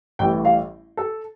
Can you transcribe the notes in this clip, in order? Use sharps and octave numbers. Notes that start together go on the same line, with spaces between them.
A1 A2 E3 G3 G5
F5
A4